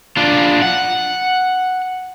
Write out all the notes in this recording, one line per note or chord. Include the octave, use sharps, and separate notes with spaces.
D4 F4
F#5